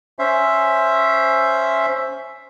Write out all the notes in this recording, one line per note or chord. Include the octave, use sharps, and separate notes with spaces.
C#4 C5 E5